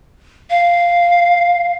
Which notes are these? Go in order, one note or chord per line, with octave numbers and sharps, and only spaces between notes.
F5